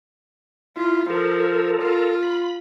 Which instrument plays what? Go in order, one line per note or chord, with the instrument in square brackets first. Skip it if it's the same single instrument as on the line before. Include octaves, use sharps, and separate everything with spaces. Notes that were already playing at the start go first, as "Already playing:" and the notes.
[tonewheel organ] E4 [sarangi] F4
[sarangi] F3 [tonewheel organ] A4 A#4
[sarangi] F4
[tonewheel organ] B5